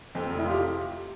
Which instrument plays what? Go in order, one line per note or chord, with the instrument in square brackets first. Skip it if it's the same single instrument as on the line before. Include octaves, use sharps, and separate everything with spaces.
[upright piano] F2 [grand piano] C4
[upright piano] F1
[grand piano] E4
F4
G4